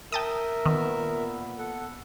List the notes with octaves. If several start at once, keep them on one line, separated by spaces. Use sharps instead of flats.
A#4 E5 G5 A5 D#6
A#2 D#3 B3
A4 F#5